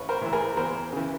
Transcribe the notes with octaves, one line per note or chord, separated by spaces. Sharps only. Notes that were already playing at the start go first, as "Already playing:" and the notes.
Already playing: A1 B4 C#5
A#4 C5
A2 E3
G#4 A#4
E2 A#4 C5
C#3 E3